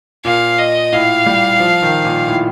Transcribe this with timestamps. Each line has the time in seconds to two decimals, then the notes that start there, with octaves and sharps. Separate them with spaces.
0.25 A#2 F5
0.58 D#5
0.92 A2 F5
1.26 G3
1.60 F3
1.82 D#3
2.05 A#2
2.28 A2